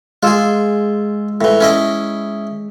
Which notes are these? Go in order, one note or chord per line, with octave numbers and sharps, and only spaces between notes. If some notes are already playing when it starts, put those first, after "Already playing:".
G#3 F4 G#4 E6
A2 E3
C#4 E4 D#5